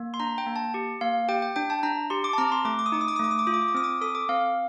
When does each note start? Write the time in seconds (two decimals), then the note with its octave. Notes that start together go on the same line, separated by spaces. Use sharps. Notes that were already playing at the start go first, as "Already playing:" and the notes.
Already playing: A#3
0.14 C6
0.20 D4 A#5
0.38 G5
0.47 A#3
0.56 A5
0.74 G4
1.01 A#3 F5
1.29 G4 G5
1.42 G5
1.56 D4 G5
1.70 A5
1.83 D4 A#5
2.10 G4 C6
2.24 D6
2.33 A5
2.38 C4 A#5
2.52 C6
2.65 A3 D6
2.79 D6
2.86 D#6
2.92 D#4 D6
3.01 D#6
3.08 D6
3.16 D#6
3.20 A3 D6
3.31 D#6
3.39 D6
3.47 F4 D#6
3.54 D6
3.61 D#6
3.68 D6
3.74 C4 D#6
3.84 D6
4.01 A4 D#6
4.15 D6
4.29 C4 F5